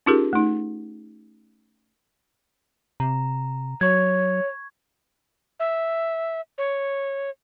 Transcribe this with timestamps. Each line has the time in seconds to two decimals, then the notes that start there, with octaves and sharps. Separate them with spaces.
0.06 C#4 D#4 F4 G4 G#4 A#4
0.33 A3 D#4
3.00 C3 A#5
3.81 F#3 C#5 C#6 G#6
5.60 E5
6.58 C#5